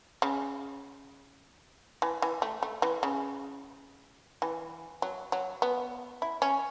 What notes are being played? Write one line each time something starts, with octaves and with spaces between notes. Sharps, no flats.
C#3
E3
E3
A3
A3
E3
C#3
E3
F#3
F#3
B3
E4
C#4